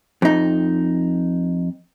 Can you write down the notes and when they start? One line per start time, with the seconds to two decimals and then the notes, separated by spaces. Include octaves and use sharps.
0.22 F2 D#4